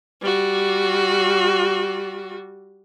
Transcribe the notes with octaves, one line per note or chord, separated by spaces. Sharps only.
G3 F#4